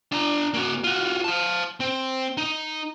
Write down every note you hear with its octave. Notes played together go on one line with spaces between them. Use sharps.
D4 A#5
A#3 F#4
F4 F#4
F5 A5
C4
D#4